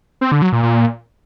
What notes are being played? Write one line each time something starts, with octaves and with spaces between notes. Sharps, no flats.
C4
D3
F#3
A#2
A#2